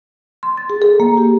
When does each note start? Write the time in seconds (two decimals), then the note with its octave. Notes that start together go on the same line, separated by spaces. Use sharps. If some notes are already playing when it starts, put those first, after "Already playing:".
0.43 C6
0.57 A6
0.70 G#4
0.82 A4
1.00 A#3
1.17 G4